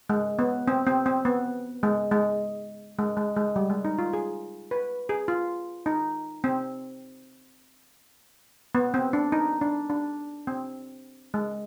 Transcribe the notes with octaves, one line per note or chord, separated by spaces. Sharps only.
G#3
B3
C4
C4
C4
B3
G#3
G#3
G#3
G#3
G#3
G3
G#3
D#4
F4
G#4
B4
G#4
F4
D#4
C4
B3
C4
D4
D#4
D4
D4
C4
G#3